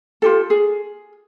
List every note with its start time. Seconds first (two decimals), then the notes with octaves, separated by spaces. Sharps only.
0.22 F4 G4 A4
0.50 G#4